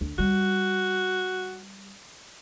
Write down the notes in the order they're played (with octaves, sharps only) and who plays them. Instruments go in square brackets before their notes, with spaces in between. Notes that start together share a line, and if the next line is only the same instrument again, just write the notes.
[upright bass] D2
[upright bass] G3 [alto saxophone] F#4